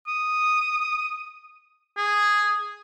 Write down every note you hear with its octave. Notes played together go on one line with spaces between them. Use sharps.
D#6
G#4